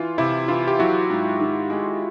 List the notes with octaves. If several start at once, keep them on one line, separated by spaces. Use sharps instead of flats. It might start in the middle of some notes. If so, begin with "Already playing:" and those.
Already playing: E3 F4
C3 E4
E3 F4
G4
F#3 E4 F#4
G#2
D#3
G#3